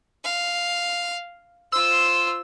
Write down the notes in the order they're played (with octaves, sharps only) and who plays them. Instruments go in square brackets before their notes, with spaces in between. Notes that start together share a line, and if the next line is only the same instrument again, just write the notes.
[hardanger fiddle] F5
[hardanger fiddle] F4 C5 [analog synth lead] E6